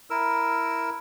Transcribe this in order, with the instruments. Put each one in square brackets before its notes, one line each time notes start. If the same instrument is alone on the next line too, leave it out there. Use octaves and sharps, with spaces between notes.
[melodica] E4 A#4 E6